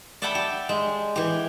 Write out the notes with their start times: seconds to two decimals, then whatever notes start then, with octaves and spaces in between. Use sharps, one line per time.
0.22 D5 E5 F#5 G5 A5 B5
0.35 G4
0.69 G#3
1.16 E3 G4